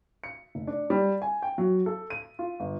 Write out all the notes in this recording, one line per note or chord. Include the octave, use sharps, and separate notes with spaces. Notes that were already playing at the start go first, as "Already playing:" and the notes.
C#7
F1
D4
G3
G#5
G5
F#3
A4
D#7
F4
G1